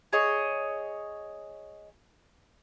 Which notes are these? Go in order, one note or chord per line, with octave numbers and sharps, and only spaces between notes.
G#4 C#5 D#5